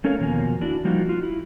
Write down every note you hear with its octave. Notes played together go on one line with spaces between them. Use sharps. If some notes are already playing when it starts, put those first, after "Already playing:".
A3 C#4 A4 A#4 C#5 F5
E2 B2 D#3 F3 A#3 G#5
D4 E4 F#4
F3 G3 A#3 D#4 F4 F#4
F4 F#4
E4